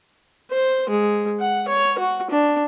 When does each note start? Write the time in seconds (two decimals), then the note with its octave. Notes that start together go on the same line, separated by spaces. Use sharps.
0.51 C5
0.89 G#3
1.40 F#5
1.68 C#5
1.98 F#4
2.31 D4